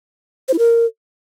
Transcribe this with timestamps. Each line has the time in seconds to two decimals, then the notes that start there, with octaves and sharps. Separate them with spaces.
0.48 C5
0.53 E4
0.58 A#4